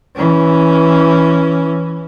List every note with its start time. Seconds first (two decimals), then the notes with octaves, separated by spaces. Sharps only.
0.16 E3 C#4